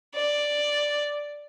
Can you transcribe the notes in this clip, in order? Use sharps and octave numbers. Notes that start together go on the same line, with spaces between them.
D5